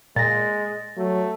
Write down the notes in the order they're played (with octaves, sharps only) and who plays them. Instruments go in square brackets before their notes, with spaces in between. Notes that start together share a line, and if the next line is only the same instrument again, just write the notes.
[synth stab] A#2 [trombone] G#3 [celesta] A6 A#6
[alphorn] F#3 [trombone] A3